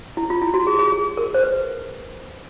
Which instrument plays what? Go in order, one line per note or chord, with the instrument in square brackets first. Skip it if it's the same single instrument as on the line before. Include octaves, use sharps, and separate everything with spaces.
[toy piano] E4
F4
E4
F#4
G#4
G#4
G#4
A#4
C5
B4